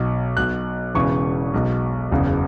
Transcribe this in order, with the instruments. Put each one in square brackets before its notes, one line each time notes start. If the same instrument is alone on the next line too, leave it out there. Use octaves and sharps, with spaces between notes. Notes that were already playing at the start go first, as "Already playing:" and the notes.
Already playing: [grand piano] B1 B2
B1 B2 F#6
E1 E2 C#3 E3 C#6
B1 B2
F#1 E2 C#3